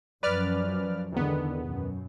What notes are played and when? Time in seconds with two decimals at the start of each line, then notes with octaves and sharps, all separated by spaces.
0.23 F#2 F3 B4 D5 F6
1.12 E2 G#2 D3 D#3 B3
1.66 F#2 B2